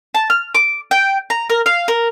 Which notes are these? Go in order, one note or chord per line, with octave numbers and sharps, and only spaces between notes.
A5
F6
D6
G5
A#5
A#4
F5
A#4